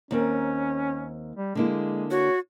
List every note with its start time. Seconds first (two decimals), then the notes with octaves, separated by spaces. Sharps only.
0.11 D#2 C4 C#4 A#4
1.35 G3
1.55 D3 G#3 A#3 E4
2.11 F#4 C#5